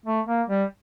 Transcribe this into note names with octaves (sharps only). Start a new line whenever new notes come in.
A3
A#3
G3